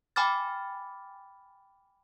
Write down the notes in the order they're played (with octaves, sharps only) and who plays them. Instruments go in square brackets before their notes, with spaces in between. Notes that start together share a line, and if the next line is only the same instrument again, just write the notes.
[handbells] G5 G#5 B5 D6 F6 A6